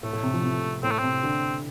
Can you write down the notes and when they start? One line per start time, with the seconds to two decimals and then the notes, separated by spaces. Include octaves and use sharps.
0.03 A2 A3
0.13 A2
0.23 C3
0.34 F3
0.43 C3
0.83 A2 C4
0.91 A3
0.99 C3 C4
1.23 D3